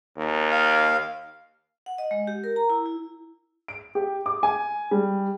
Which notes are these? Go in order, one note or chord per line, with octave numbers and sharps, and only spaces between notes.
D#2
F5
F#5
D#5
G#3
G4
A#4
A#5
E4
E4
D7
G4
D6
G#5
G3